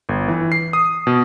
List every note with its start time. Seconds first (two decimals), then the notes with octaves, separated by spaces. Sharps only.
0.09 G1
0.28 E3
0.52 C7
0.73 D#6
1.07 B2